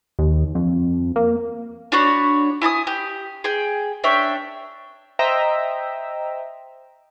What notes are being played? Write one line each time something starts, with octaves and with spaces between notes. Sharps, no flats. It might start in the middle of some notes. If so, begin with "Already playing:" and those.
D#2
F2
A#3
D4 F#4 C#5 B5
E4 G#5 A5 D#6
G4
G#4 G5
C#4 D4 E5 G5
C5 D#5 E5 G5 A#5